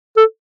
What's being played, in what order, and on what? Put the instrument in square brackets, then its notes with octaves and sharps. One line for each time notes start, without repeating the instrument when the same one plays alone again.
[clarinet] A4